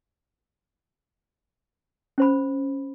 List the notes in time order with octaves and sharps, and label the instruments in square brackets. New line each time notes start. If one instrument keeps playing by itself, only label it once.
[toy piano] C#4 C5 B5